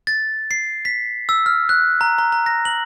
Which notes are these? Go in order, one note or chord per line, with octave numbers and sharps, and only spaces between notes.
A6
C7
B6
E6
F6
F#6
A#5
A#5
A#5
A#6
F#7